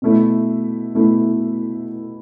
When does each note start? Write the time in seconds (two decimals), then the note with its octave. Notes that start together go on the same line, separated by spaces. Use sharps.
0.02 B2 A3 E4
0.95 B2 A3 E4